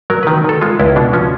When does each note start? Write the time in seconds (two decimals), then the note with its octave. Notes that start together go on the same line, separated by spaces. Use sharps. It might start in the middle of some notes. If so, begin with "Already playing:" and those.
0.10 F#3 A#4
0.23 D#3 B4
0.44 D#3 A4
0.61 G#3 F4
0.79 C#2 E4
0.96 B2 D4
1.13 F3 C#4